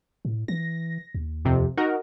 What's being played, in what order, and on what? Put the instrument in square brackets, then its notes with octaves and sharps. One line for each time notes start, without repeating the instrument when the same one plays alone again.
[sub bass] A2
[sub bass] E3 [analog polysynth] A#6
[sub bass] D#2
[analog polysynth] F2 C3
D#4 F#4 A#4